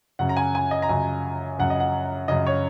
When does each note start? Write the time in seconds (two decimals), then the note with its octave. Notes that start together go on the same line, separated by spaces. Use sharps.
0.19 F#2 C#3 F#5
0.29 A#5
0.37 G#5
0.55 G#5
0.71 D#5
0.82 A#5
0.89 F#2 C#3 G#5
1.59 F#2 C#3 F#5
1.70 D#5
1.80 F#5
2.28 F#2 C#3 D#5
2.46 C#5